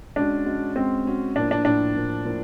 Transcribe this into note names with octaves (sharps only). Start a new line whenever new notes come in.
G#3 C#4 D4 F#4
G#3 C#4 F#4
G#3 C4 C#4 F#4
G#3 C#4 F#4
A2 F3 A#3 D4
D4
A2 F3 A#3 D4
A2 F3 A#3
A2 F3 A#3